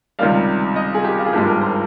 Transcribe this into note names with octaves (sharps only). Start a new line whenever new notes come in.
C#2 C3 D#3 G3 F5
D#5
G#4
G4
F4
G#4
G#1 G2 F3 G#3 G4
A#4
C5